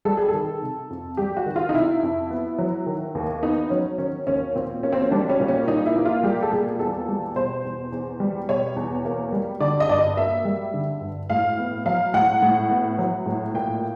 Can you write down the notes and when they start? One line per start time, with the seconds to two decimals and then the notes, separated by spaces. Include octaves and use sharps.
0.05 G3 A4
0.17 G#4
0.29 A4
0.34 D#3
0.62 C3
0.90 F2
1.17 G3 G4
1.37 F#4
1.46 D#3
1.56 F4
1.69 D#4
1.74 C3 E4
2.03 F2
2.31 B3
2.58 F#3
2.86 D#3
3.15 D#2
3.43 B3 D#4
3.70 F#3 C#4
3.98 D#3 C#4
4.27 D#2 C#4
4.55 A#2 C4
4.83 A#3 C#4
4.92 C4
5.02 C#4
5.11 G3 D4
5.30 C#4
5.40 A#2
5.48 C#4
5.67 A#2 D#4
5.86 E4
5.96 A#3
6.05 F4
6.23 G3 G4
6.43 A4
6.52 A#2 G#4
6.79 E2 A4
7.08 G3
7.36 B2 C5
7.65 E2
7.92 E2
8.20 G3
8.48 B2 C#5
8.76 E2
9.05 A#3
9.32 G3
9.60 D3 D5
9.80 D#5
9.89 G2 D5
9.99 D#5
10.17 A#3 E5
10.45 G3
10.74 D3
11.01 G2
11.30 A2 F5
11.58 B3
11.86 F#3 F5
12.14 A2 F#5
12.42 A2
12.70 B3
12.98 F#3
13.26 A2
13.54 A#2 G5